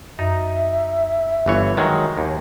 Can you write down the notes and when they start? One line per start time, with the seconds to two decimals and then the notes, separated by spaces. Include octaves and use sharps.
0.19 F#2 D#4 E5
1.46 G1 E3 C#5
1.77 D#3 F#3 G#3
2.18 D#2